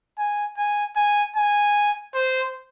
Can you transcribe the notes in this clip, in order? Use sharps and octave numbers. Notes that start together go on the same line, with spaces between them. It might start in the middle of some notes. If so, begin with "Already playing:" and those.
G#5
G#5
G#5
G#5
C5